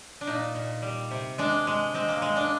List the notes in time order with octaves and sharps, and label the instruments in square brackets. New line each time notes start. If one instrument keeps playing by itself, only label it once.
[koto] D4
A#2 D#4
A#2
G3
C3
G#3 D4
G#3
G#3 C4
A#3
G#3
D4